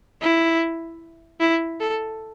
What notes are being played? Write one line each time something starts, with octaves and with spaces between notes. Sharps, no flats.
E4
E4
A4